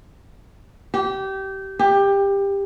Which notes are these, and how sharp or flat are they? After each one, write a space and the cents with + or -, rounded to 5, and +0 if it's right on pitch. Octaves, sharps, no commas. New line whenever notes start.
G4 -20
G4 +20